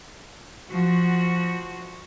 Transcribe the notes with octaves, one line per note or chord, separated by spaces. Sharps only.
F3 F#4